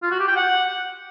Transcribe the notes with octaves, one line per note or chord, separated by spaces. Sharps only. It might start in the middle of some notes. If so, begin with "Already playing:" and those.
F4
F#4
G4
G5
F#5